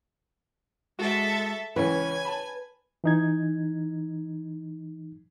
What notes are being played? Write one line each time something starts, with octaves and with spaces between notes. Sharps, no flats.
G#3 F#4 A4 E5
C#2 E3 C#4 B4 C#5 G#5
A5 B5
E3 D#4 G#6